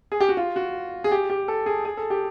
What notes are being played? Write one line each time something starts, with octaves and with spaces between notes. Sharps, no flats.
G#4
G4
F#4
F4
F#4
G#4
G4
G4
A4
G#4
G#4
A4
G4